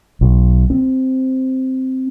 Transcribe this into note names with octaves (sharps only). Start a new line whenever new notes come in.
B1
C4